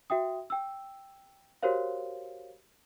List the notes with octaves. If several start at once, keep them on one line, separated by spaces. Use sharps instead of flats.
F#4 E5 G5 D#6
G5 E6
F#4 G4 A#4 C5 C#5 F5